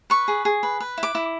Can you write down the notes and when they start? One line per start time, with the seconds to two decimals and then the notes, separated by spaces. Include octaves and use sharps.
0.10 B4 C#6
0.28 G#4
0.45 G#4
0.63 B4
0.80 B4
0.98 E4
1.03 D6
1.15 E4